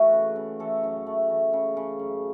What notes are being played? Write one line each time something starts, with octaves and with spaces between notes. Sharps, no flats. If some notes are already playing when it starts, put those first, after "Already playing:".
Already playing: E3 A3 F#4
C#3
C#3
E3 A4
F#2
A3
E3
C#3
C#3
F#2